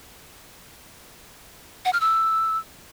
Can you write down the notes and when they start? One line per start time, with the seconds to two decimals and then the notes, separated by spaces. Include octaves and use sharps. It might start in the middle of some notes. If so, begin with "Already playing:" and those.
1.85 F#5
1.93 F6
2.01 E6